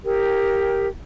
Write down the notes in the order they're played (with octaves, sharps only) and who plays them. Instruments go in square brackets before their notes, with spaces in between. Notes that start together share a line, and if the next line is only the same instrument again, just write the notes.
[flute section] G4 A#4 G5